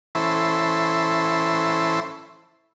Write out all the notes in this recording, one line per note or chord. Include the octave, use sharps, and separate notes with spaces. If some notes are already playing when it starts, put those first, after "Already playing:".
E3 C#4 E4 A4 C5